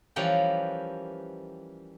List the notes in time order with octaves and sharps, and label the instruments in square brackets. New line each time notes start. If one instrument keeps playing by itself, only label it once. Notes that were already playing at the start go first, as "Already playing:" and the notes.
[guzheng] E3 F3 G3 C#4 G4 A#4